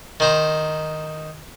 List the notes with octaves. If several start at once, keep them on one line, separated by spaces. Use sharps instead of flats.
D#3 C5 A#5